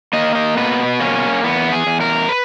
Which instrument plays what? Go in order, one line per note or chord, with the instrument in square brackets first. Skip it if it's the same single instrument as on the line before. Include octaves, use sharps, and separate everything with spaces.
[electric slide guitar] A#3 D#5
D#5
B2 B4
A#3 C#4
E2 B3
G#4
E2
A#4
B4